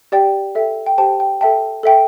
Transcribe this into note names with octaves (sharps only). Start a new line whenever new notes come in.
G4 D5 G5
A4 E5 G5
G5
G4 C5 G5 A5
G5
A4 E5 G5 A5
A4 E5 G5